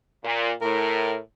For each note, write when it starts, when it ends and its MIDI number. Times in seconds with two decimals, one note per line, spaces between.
0.25 0.52 46
0.62 1.15 45
0.62 1.18 70